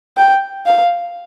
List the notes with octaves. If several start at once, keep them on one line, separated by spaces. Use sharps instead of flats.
G5
F5